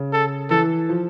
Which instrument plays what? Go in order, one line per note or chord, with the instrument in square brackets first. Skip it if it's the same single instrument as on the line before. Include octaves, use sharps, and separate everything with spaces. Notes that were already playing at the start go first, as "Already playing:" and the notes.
Already playing: [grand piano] C#3
[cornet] A4
[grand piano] E3 [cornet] A4
[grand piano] F3